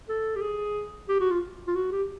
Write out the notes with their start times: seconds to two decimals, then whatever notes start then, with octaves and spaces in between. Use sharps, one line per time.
0.09 A4
0.36 G4
0.41 G#4
1.09 G4
1.20 F#4
1.31 F4
1.67 F4
1.75 F#4
1.91 G4